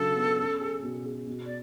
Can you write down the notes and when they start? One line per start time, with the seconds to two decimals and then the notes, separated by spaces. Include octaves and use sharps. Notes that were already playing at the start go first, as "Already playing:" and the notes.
Already playing: C#3 F#3 D4 A4
0.16 B3
0.38 C#4
0.61 G#4
0.82 B2
1.05 G#4
1.27 B2
1.45 D5